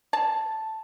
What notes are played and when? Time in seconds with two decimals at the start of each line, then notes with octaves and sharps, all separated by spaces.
0.13 A5